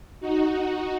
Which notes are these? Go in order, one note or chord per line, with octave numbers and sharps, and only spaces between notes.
D#4 F#4
D#4 F#4